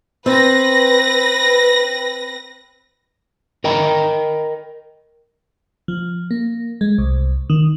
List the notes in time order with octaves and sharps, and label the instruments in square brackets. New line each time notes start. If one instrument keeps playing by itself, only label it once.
[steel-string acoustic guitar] C4 [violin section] B4 A#6
[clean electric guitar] A#4 D#5 G5 A#5 B5
[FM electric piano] F3
A#3
G#3
C2
D#3